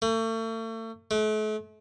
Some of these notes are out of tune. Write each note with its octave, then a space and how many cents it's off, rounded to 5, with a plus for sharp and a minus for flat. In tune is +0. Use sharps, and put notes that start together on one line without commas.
A3 +40
A3 -40